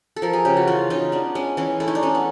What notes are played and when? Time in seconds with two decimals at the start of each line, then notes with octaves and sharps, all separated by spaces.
0.16 A4
0.22 F3 A#4
0.33 G#4
0.45 C#3 G4
0.57 F#4
0.67 E3 F4
0.90 C#3 D#4
1.12 B3 D4
1.35 G#3 C#4
1.57 E3 C#4
1.80 A3 E4
1.88 D#4
1.95 D4
2.03 A3 C#4
2.15 B3